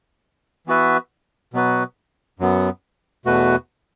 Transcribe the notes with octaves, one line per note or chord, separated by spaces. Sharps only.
E3 B3 F#4 B4 E5
B2 F#3 B3 F#4 B4
F#2 F#3 B3
E2 B2 A3 F#4 B4